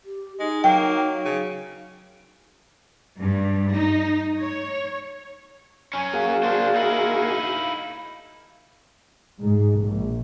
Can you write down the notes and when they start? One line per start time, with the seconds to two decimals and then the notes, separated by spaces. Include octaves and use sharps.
0.05 G4
0.40 G#3 D#4
0.64 F#3 A#3 G5
1.25 C#3
3.21 G2
3.74 D#4
4.38 C#5
5.93 F#3 C#4 G#5
6.13 A#3 F#4 G#4 F5
6.43 D4 C5
6.76 D#4 E4
9.41 G#2
9.80 A#1